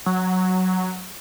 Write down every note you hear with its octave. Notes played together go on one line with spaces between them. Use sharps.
F#3